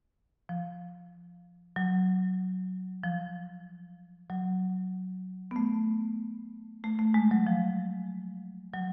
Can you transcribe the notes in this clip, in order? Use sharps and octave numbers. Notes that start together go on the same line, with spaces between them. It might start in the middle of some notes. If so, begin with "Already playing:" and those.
F3
F#3
F3
F#3
B3
A3
A3
A3
G#3
F#3
F3
F#3